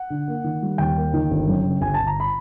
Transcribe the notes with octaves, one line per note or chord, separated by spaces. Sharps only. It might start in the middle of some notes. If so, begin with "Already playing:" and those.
Already playing: F#5
D3
A#3
D#3
G3
D#2 G5
A#3
D#3
G1
F#2
C#3
G1 G#5
G1 A5
A#5
B5